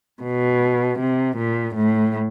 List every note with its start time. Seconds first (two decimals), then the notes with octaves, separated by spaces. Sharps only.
0.23 B2
0.99 C3
1.37 A#2
1.75 A2